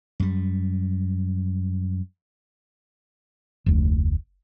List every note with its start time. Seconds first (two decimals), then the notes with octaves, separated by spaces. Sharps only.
0.20 F#2 G3
3.66 F1 D2